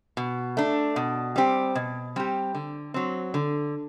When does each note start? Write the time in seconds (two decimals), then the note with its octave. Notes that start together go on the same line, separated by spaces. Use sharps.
0.17 B2
0.57 A3 D4
0.96 B2
1.36 G3 C4 G4
1.75 B2
2.16 G3 C4 G4
2.55 D3
2.94 F#3 C4
3.34 D3